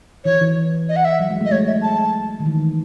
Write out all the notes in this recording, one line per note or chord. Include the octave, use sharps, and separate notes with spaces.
E3 C#5
E3
D#5
F#5
E5
F#3
G#3
A3
D#5
G#3 C#5
E5
A5
D#3
E3